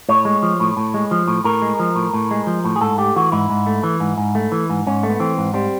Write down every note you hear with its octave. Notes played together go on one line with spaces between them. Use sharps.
A2 C#5
G#3
F3
A2
A2
G#3
F3
A2
A2 A#4
G#3
F3
A2
A2
G#3
F3
A2
G#4
G#2 A4
A3 G4
E3 F#4
G#2 E4
G#2
A3
E3
G#2
G#2
A3
E3
G#2
G#2 C#4
A3
B3
E3 C4
G#2
G3 C4